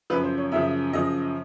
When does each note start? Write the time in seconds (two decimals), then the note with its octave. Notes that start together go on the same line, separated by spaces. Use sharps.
0.10 F#2 C#3 F3 B4
0.24 C5
0.38 C#5
0.52 F#2 C#3 F3 E5
0.93 F#2 C#3 F3 D#5